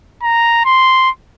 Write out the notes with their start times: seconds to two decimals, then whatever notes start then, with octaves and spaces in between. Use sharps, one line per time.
0.23 A#5
0.65 C6